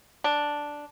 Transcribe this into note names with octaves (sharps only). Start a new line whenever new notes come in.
D4